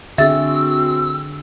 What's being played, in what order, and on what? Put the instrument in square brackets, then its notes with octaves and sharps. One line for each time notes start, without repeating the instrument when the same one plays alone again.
[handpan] D3 G#4 [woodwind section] C4 F#4 [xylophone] E5 A6 [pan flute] E6